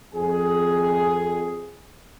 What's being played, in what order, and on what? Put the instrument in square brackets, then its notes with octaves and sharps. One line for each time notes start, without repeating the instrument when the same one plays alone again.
[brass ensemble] F2 G#4